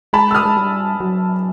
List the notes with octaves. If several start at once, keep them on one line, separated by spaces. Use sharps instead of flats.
G#3 A5 B5
E6
D#6 F6
G#3
G3
F#3